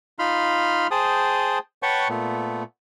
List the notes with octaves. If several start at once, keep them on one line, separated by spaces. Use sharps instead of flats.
D#4 F4 B5 C6 F6
G#4 C5 G5 A5 D#6
B4 C#5 F#5 G5 A5 C#6
A#2 A3 B3